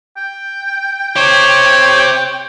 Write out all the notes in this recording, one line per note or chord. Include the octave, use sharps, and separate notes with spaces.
G5
G4 C5 C#5